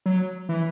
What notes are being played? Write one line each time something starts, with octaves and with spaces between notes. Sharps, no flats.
F#3
E3